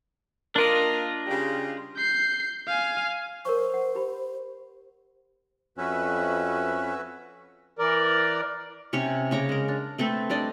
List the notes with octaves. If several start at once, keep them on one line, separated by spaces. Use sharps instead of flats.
A#3 D4 F4 A#4 D#5
C#3 G3 G4
G6 C7
F5 G#5
A#4 C5 C#5 C#6
F#5
G4 B5
F2 C#4 F#4 B4 E5
E3 A#4 D5
C3 C#4 G4 C#5
C#3 C#5 A#5 D6
G#3 A#4
D4
A3 C4 A4 B4
G3 D4 D5 D#5